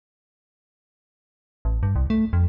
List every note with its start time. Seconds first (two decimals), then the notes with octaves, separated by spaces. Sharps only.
1.65 A1
1.83 G2
1.96 C2
2.10 A3
2.33 F2